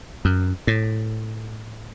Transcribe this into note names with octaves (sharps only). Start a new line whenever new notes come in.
F#2
A2